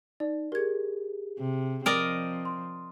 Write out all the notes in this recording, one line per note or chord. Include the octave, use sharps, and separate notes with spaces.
D#4 D5
G4 G#4 A#4 G#6
C3
F3 C4 A#4 D5 D#5 G5 F6
C6